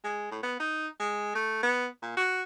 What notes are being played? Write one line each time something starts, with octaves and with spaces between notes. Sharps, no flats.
G#3
A2
B3
D#4
G#3
A3
B3
A#2
F#4